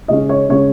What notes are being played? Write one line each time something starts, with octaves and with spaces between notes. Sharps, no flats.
C#3 G#3 C#4 D#5
C#5
C#3 G#3 C#4 C#5